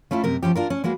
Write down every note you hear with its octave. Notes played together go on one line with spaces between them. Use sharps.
A3 C#4 E4 F4
F#2 C3 A#4
F3 G#3 C#4 G4
D4 F4 A#4
C#4
G#3 A#3 F#4 B4